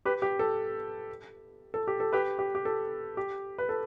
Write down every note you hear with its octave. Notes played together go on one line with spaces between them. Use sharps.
G4 B4
G4
A4
A4
G4
A4
G4 B4
G4
G4
A4
G4
B4
A4